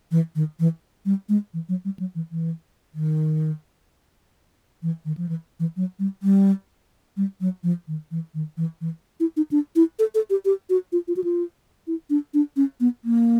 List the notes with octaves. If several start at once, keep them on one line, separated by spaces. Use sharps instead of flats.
E3
D#3
E3
G3
G#3
E3
F#3
G3
F#3
E3
E3
D#3
E3
D#3
F3
E3
E3
F#3
G3
G3
G3
F#3
F3
D#3
E3
D#3
E3
E3
E4
D#4
D4
E4
A4
A4
G4
G4
F#4
F4
F4
F#4
F4
E4
D4
D4
C#4
B3
A#3